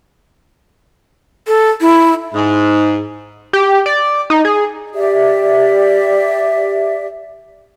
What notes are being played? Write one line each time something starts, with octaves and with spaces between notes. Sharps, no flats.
A4
E4
G#2
G4
D5
D#4
G#4
G4 D5 E5